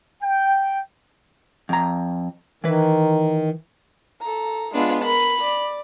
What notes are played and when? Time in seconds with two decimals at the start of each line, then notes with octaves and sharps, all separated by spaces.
0.22 G5
1.69 F2 A#5
2.64 D#3 E3 B4
4.21 A4 A#5
4.74 G#3 B3 D4 F4
5.04 A#4 B5
5.39 D5